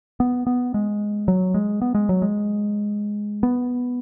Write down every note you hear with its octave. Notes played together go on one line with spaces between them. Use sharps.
B3
B3
G#3
F#3
G#3
B3
G#3
F#3
G#3
B3